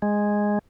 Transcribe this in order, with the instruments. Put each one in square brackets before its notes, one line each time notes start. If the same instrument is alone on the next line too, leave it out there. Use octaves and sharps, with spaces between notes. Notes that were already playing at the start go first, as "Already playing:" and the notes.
[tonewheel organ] G#3